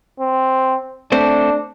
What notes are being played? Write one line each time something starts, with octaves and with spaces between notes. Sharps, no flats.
C4
A3 C4 D4 C5